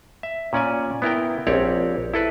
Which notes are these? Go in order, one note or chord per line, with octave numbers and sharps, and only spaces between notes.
E5
A#2 C#4 D5 G#5
B3 E4 A#4 G5
A#1 C4 G4 C#5 D5
E4 A4 B4